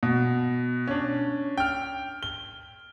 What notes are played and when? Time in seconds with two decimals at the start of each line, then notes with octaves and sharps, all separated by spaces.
0.03 B2
0.88 C#4 D4
1.58 G5 F6
2.23 G7